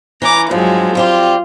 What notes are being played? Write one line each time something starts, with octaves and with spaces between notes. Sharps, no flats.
E3 C#4 A#5 D6
G2 F3 F#3 G#3
G3 C4 F4 G4